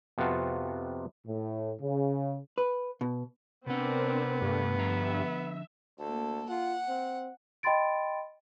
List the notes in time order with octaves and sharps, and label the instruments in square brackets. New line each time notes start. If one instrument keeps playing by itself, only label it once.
[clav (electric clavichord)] F2 C3 B3 F4 F#4 A5
[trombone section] A2
C#3
[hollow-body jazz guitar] B4
B2
[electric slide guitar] C3 F#5 [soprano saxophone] B3 [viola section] C4 D4 A#4
[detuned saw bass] G2 [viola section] A3
[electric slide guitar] D3 F3 A#5 [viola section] E5
[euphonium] D2 [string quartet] A#3 A4
[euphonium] F4 [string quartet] F#5
[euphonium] C4
[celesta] D#5 G5 B5 C6 A6 D7